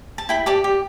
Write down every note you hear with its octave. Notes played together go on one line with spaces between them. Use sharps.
A5
E4 G5 B5
G4 D5 A5 D6
G4